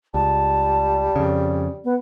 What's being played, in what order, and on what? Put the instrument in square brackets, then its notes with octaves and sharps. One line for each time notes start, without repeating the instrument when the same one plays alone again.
[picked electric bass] C#2 [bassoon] G3 [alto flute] A5
[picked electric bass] F2 C#3
[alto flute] B3